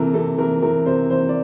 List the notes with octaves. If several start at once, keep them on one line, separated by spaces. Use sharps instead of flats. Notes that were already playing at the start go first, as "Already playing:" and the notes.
Already playing: C3 E3 A4 A#4
C3 A4
E3 A#4
E3 A#4
C3 C5
E3 C5
D5